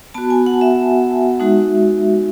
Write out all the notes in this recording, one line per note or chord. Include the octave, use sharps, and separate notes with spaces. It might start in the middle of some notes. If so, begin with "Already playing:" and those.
B3 F#4 A5
G#5
F#5
E5
G#3 D#4 F#4